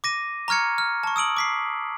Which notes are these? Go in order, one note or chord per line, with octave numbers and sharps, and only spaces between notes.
D6 A#6 D#7
A#5 C#6 F6 G#6 C#7
F6
A5 C#6
D#6 E6 D7 F#7
D6 B6 C7